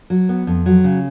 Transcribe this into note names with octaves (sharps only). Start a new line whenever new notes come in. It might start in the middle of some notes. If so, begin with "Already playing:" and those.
F#3
B3
F2
F#3
C#3